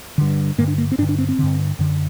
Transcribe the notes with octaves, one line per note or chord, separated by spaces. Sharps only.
G2 D3
G2 D3 A#3
D4
A#3
C4
G2 D3 D4
D4
C4
C4
G2 D3
F#2 D3